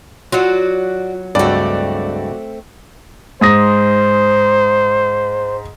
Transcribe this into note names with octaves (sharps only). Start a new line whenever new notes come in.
F#3 F4 F#4 D5
C#2 G2 A3 C4 F#4 D5
G#2 C5 D#6 A#6